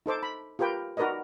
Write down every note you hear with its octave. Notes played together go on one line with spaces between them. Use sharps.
D#4 A4 C5 D6
B5
F4 G4 A#4 B4 G5
D#4 F#4 A#4 B4 D5 D#5